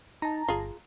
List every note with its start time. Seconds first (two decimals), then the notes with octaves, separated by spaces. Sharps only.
0.22 D#4 A5 A#5
0.48 G1 F4 G#4